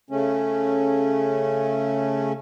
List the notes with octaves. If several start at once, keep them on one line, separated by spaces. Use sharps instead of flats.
C#3 A3 C#4